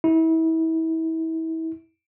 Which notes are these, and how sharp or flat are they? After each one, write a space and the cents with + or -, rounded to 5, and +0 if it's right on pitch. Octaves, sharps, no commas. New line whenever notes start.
E4 -35